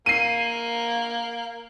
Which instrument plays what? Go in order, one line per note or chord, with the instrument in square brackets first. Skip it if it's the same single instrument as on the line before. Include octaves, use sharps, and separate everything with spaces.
[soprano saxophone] A#3 [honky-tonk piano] C7 D#7